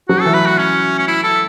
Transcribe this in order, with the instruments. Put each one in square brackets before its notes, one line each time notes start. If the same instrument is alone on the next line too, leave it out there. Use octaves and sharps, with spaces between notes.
[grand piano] F#3 [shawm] F#4
[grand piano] E3 [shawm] A4
[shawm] B4
F#4
C#4
C#4
E4
A4